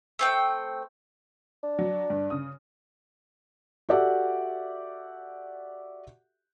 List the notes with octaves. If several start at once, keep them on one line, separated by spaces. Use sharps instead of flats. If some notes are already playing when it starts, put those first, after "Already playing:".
A3 C4 G5
D4
F#3
G2
C#3 D#6
F#4 G4 A4 D5 E5 F#5